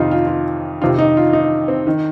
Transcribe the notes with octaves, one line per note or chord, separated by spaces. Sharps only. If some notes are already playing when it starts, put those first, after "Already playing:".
Already playing: F2 C3 D#3 D#4 F4
F4
F4
F2 C3 D#3 F4
D#4
F4
D#4
C4
D#3